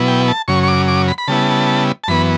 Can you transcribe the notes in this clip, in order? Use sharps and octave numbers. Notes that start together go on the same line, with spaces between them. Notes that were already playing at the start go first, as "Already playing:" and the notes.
Already playing: B2 F#3 B3 E4
G5
A5
F#2 C#3 F#3 C#6
C#6
D6
D6
B5
B5
C#3 G3 B3 E4 A5
A5
F#2 E3 B3 B5